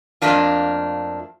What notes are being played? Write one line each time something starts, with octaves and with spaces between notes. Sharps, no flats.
F2 C3 A3 A#3 D4 F4